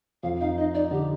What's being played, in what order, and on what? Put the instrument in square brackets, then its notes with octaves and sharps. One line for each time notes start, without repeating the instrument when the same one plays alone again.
[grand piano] F2 [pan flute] F5
[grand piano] D#4 [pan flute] F5
[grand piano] D#4 [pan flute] D#5
[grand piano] D#4 [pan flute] D5
[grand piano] D3 [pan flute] G4